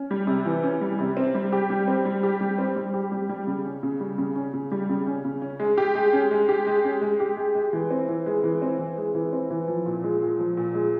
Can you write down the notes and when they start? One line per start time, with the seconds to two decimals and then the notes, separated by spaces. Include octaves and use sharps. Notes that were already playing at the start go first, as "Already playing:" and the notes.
Already playing: C#4
0.11 G3
0.27 C3
0.45 E3
0.63 C#4
0.81 G3
0.99 C3
1.17 C4
1.35 G3
1.52 G4
1.70 G3
1.88 C4
2.05 G3
2.23 G4
2.41 G3
2.58 C4
2.76 G3
2.94 G4
3.12 G3
3.29 G3
3.47 C#3
3.65 C#4
3.83 C#3
4.00 G3
4.18 C#3
4.36 C#4
4.53 C#3
4.72 G3
4.89 C#3
5.07 C#4
5.25 C#3
5.42 C#4
5.60 G#3
5.78 G4
5.95 G#3
6.13 C#4
6.31 G#3
6.49 G4
6.67 G#3
6.84 C#4
7.01 G#3
7.20 G4
7.37 G#3
7.55 G#3
7.73 E3
7.91 C4
8.09 E3
8.26 G#3
8.44 E3
8.62 C4
8.79 E3
8.97 G#3
9.15 E3
9.33 C4
9.50 E3
9.68 F3
9.86 A#2
10.04 G#3
10.22 A#2
10.39 F3
10.57 A#2
10.75 G#3